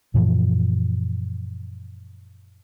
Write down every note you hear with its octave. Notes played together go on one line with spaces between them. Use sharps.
F#2 A#2 E3 F3